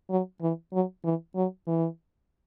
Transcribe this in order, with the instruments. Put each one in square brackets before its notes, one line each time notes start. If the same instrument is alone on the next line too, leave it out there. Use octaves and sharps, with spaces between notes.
[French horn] F#3
E3
F#3
E3
F#3
E3